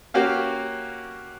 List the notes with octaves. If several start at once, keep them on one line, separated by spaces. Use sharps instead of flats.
A#3 C#4 F#4 G4 F5